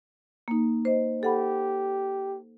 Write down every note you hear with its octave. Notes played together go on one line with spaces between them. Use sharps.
A#3 D#4
C5 D#5
G4 A4 F#5 B5